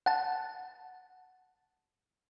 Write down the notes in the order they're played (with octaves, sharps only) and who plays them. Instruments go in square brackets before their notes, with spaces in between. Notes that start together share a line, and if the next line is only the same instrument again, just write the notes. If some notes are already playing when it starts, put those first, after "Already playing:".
[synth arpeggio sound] F#5 A5